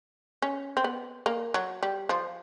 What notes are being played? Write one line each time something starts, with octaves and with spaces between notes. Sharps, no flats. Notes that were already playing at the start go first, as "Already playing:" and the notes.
C#4
C4
B3
A#3
F#3
G3
F3